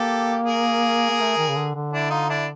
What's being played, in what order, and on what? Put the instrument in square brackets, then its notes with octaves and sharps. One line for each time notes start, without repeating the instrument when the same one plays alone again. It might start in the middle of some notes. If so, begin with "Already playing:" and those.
Already playing: [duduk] A#3 [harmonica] G4 A4
[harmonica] G#4 A#4
[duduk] A#3
A3
D#3
C#3
D3
D3
[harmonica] D4 E4
D#4 F4
D4 E4